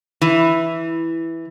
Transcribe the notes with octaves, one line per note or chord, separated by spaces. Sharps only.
E3